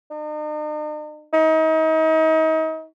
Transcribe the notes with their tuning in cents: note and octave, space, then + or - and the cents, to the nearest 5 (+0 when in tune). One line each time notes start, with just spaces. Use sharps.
D#4 -45
D#4 +35